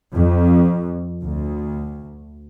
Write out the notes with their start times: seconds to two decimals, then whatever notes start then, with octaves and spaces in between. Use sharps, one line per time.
0.15 F2
1.22 D2